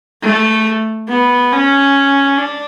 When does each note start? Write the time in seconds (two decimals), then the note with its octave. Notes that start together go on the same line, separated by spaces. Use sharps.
0.23 A3
1.09 B3
1.52 C#4
2.37 D4